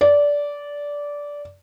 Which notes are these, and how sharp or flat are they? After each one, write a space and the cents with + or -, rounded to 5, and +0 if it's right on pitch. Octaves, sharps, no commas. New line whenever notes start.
D5 -15